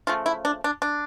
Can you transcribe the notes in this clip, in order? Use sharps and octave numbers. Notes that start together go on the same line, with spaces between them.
C#3 F3 A3 F4
E4
D4
D4
D4